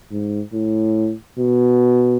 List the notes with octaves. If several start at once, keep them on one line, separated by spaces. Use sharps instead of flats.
G#2
A2
B2